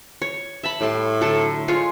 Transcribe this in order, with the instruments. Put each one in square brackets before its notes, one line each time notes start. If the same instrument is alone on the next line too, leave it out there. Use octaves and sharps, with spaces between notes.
[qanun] C#5
E5 A5 B5
[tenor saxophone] A2 [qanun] G3 A5 C6
[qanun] D3 F#3 A4
G#3 F4 C#5